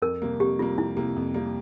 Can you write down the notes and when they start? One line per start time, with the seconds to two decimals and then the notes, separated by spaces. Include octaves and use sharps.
0.02 F2 A#4
0.22 C3 G3 A#3
0.40 F2 G4
0.59 C3 G3 A#3 F4
0.77 F2 E4
0.97 C3 G3 A#3
1.16 F2
1.34 C3 G3 A#3